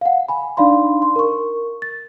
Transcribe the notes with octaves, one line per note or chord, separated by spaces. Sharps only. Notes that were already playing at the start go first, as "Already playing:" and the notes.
F5 F#5
G#5 B5
D4 D#4 D5 F5 B5 C6
C6
A#4 C#6
A6